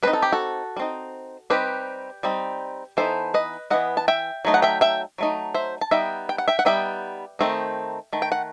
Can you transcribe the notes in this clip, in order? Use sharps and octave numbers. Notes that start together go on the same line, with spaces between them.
G3 C4 D#4 B4
A4
G4
F#4 A4
G3
C4 D#4
G3 C4 D#4 G4 B4
G3 C4 D#4
E3 B3 D#4 A4 C5
B4 D#5
E3 B3 D#4 D#5 F#5
A5
E5 G5
F#3 A3 D#4
F#5
E5 G5
E5 G5
F#3 A3 D#4
C5 E5
A5
G3 B3 D#4 E5 G5
G5
F#5
E5 G5
F#5
G3 B3 D#4 E5 G5
D#3 A3 C4 D#4
D#3 A3
G5
F#5